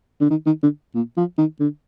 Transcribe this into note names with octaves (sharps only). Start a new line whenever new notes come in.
D3
D#3
D#3
D3
A#2
F3
D#3
D3